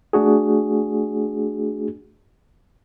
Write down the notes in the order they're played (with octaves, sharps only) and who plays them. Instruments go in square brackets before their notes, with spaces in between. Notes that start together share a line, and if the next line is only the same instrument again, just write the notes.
[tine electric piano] A3 D4 F#4 G#4